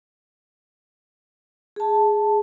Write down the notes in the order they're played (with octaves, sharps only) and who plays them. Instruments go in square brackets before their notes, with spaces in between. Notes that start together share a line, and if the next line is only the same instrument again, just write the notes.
[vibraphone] G#4 A5